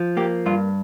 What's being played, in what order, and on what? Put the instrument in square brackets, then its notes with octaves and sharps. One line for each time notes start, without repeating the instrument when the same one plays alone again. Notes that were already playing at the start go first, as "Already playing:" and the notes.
Already playing: [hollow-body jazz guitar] F3
A#3 G4
G2 F4